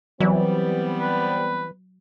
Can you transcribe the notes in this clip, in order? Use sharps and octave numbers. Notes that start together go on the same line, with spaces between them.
E3 F#3 G3 B3 C4
B4